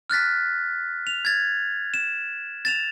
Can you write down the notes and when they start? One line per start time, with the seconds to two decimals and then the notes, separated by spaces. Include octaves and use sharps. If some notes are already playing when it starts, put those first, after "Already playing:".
0.10 F6 F#6 A6 B6
1.07 F7
1.25 G#6 A6
1.94 E7
2.65 A6 E7 F7